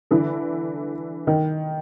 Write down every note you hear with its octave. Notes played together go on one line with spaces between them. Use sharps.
D3 E3
D#3